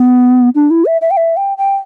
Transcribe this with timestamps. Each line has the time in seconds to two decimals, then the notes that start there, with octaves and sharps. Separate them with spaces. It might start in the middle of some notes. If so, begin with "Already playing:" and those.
Already playing: B3
0.55 D4
0.70 E4
0.86 E5
1.01 E5
1.11 G5
1.17 E5
1.37 G5
1.58 G5